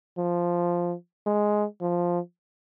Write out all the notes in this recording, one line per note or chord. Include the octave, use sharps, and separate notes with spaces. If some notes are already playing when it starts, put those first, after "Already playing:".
F3
G#3
F3